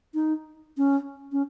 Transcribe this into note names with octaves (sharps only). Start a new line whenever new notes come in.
D#4
C#4
C#4